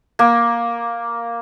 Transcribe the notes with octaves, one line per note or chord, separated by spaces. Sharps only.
A#3